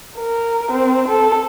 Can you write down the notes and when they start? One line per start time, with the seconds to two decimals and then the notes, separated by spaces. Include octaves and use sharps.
0.17 A#4
0.71 C4
1.08 A4